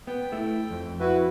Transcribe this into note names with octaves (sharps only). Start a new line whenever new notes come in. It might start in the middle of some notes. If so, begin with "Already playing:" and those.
B3 G5
A3 E4
F2
E4 F#4 B4